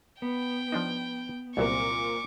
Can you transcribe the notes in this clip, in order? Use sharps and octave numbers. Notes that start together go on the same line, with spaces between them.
B3 G5
F3 D4 D#4
C2 A#2 F#3 C4 A#4 A5 C#6 D6